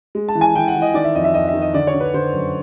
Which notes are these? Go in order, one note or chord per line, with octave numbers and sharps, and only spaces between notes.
G#3
A5
E3
G#5
E3 G5
F#5
E3
D#5
D#3 D5
E5
F2 D#5
E5
F2 D#5
E5
D#3
D#5
D3 D5
C#5
D3
B4
D3 C5
F#2